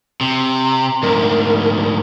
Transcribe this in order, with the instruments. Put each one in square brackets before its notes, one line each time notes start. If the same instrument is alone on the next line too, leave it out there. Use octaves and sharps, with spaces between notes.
[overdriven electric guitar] C3
[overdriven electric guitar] D2 G#2 [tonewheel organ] A#4